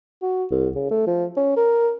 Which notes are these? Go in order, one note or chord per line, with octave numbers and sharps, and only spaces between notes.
F#4
C2
C#3
A3
F3
C#4
A#4